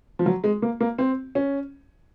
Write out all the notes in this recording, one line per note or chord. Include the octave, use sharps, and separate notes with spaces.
F3
F#3
G#3
A#3
A#3
C4
C#4